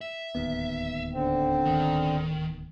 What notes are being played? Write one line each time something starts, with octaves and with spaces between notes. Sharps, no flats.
E5
D1 D#2 B3
D3 C4
D#3